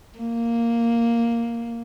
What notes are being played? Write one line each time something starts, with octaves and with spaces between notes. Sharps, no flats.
A#3